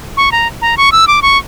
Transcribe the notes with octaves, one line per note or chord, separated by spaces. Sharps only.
C#6
A#5
A#5
C#6
E6
D6
C#6